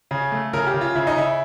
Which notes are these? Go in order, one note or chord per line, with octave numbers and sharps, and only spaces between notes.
C#3
A3
C#3 A#4
G4
C#3
F4
C#3 E4
D#4
C#3 E4